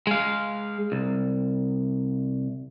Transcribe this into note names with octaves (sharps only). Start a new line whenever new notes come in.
G#3 F5
C2